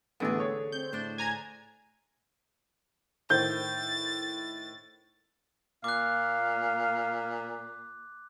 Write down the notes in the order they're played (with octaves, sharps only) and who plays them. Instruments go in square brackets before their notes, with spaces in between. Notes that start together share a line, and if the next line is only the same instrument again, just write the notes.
[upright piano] A1 B3 [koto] D3 G#4 [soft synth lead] A3
[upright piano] C#5
[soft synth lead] C4 [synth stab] G6
[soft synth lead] A2 [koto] D4 C5
[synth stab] G#5 A#5 G#6
[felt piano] A2 D#3 C5 [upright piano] G6 [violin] A6
[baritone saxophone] A#2 [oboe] F5 [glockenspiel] D6 F#6